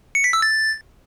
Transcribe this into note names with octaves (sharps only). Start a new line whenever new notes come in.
C#7
B6
E6
A6